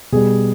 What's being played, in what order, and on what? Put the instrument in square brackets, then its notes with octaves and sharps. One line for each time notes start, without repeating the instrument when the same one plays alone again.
[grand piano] B2 G3 G#4